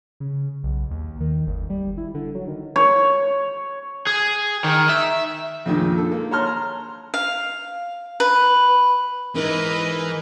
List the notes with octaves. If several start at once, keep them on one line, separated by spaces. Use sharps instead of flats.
C#3
B1
D#2
D#3
G1
G3
E4
D3
F#3
D#3
C#5
G#4
D#3
E5
F2 A#2 D3 D#3 G#3
D3 A4
A#3
C#5 A5 A#5 C6 F6
A#5
F5
B4
G#2 E3 A#4 B4 D#5